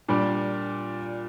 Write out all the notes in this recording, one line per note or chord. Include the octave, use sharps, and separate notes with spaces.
A#2 G3 D4